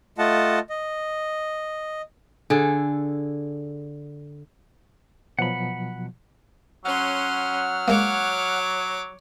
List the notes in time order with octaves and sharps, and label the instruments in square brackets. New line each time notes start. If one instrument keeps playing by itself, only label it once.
[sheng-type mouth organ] A3 F4 D#5 F#5 A5
D#5
[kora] D3 G#4 A4
[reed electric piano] B2 F3 F#3 [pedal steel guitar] F#5 B5
[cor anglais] F#3 [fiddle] C#4 C6 [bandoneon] F#5 F6
[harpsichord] G#3 A#3 [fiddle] C#5 D6